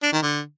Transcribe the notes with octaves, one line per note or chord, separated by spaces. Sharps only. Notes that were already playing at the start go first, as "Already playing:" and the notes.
D4
D#3
D3